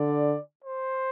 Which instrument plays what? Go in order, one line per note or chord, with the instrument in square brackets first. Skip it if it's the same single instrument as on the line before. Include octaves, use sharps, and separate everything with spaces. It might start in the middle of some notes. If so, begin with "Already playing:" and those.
Already playing: [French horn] D3 [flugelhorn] D5
[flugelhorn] C5